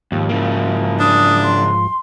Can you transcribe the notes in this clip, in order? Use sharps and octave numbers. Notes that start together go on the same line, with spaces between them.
D#2 G#2 F3
C#3 A#3
D4 D#6
C6